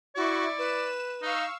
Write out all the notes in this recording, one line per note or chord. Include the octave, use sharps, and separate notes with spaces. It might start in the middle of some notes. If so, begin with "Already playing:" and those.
E4 F#4 D5 C#6
B4 E7
D#4 F5 C#6 E6